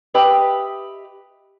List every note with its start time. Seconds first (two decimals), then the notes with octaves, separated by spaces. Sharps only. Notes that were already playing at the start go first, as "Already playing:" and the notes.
0.14 G4 B4 D#5 E5